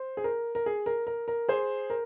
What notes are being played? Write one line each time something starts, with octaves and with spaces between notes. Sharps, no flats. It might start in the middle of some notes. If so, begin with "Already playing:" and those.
Already playing: C5
G#4
A#4
A#4
G#4
A#4
A#4
A#4
G#4 C5
A#4